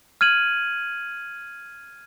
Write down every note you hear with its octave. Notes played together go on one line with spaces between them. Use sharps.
F6 G#6 D#7 F#7